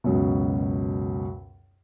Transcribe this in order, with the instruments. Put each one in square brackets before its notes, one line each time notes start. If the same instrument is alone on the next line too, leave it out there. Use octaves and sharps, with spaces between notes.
[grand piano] C#2 F#2 B2